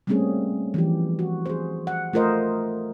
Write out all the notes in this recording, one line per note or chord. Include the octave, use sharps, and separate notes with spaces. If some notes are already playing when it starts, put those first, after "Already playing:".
G3 A3 A#3 C4 C#4 G#4
E3 F3 G4
F#4
G#4 C5
F#5
A3 F4 A#4 C5 D#5